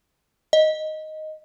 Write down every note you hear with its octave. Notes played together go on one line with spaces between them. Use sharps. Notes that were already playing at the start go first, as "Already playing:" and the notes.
D#5